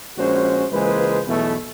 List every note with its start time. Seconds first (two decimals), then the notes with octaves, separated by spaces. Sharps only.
0.18 A#1 G#3 C#4 F#4 C5
0.72 C#2 E3 G#3 A#3 B4 C5
1.27 B1 E2 B2 E3 A3